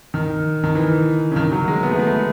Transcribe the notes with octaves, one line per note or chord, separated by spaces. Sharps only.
D#3
D#3
E3
C#3
D#3
F#3
G#3
B3
A3
G#3
A3